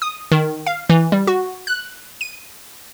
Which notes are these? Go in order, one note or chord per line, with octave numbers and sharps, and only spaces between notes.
D#6
D#3
F5
E3
G3
F#4
F#6
D#7